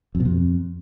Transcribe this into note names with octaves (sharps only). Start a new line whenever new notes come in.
F2
B2
F2